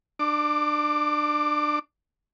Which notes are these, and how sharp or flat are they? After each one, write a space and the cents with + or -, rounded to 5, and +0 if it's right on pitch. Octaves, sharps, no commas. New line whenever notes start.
D4 +25 D6 +0